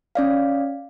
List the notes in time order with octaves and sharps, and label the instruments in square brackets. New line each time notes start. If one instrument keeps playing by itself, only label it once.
[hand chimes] C#4 D5 F5